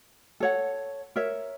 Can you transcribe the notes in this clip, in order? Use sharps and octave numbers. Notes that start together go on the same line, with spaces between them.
A4 C#5 F#5
A#4 C#5 E5